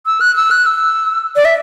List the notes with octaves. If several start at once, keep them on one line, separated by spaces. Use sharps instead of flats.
E6
F#6
E6
F#6
E6
D5
E5